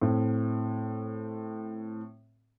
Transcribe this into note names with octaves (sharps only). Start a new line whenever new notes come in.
A2 C4